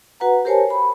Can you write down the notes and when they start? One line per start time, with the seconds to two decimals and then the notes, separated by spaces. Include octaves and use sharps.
0.20 F#4 B4 F#5 A#5
0.45 G4 A#4 C5 C#5 G#5 A5
0.70 B5